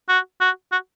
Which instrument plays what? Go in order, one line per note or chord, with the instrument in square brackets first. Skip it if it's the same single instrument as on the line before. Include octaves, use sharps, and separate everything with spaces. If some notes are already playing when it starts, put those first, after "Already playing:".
[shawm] F#4
F#4
F#4